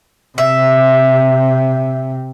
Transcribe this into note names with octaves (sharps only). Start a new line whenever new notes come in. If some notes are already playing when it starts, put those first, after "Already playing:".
C3 E5